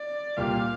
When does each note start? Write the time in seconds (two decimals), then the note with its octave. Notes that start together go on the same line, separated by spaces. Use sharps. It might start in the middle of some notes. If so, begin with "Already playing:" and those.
Already playing: D5
0.37 C2 A#2 A#3 G4 F5